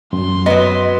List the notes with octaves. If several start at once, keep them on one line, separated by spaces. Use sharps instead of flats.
F#2 C6
F#3 B3 D#5